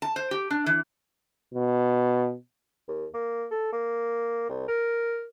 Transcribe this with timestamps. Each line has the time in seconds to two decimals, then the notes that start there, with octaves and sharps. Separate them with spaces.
0.02 A5
0.16 C5
0.31 G4
0.51 D4
0.66 E3
1.54 B2
2.88 D#2
3.14 A#3
3.51 A4
3.73 A#3
4.49 C2
4.68 A#4